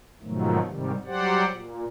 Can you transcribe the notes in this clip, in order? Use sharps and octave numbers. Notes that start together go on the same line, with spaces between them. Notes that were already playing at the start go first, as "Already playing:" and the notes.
G#2 B2 D#3 F3 F#3 A3
G#2 C3 D#3 G3
F#3 G3 G4 C5 D5 F#5
A#2